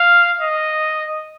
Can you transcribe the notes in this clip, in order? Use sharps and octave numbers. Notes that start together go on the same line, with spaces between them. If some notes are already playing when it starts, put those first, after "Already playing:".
Already playing: F5
D#5